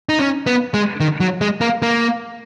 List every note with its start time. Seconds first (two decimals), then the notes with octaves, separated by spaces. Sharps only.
0.09 D#4
0.19 C#4
0.47 B3
0.74 G#3
1.00 D#3
1.20 F#3
1.41 G#3
1.61 A#3
1.82 A#3